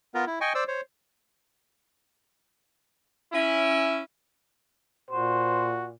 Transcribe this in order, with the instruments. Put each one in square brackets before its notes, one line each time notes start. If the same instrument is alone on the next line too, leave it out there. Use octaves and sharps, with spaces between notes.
[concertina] B3 F4 A#4
E4
D#5 G5 G#5 C#6
C5 D5 E6
C5 C#5
[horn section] C#4 E4
[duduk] A#2 [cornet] F#4 [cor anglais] C5